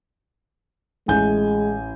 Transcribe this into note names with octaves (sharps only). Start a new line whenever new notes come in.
A1 G#3 G#5 G6